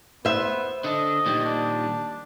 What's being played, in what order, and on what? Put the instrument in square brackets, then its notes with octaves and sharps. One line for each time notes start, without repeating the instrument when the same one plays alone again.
[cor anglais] B3 [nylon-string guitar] C5 E5
[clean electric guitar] D3 D4 [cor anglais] D#5
[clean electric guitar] A#2 D#3 G3
[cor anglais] D4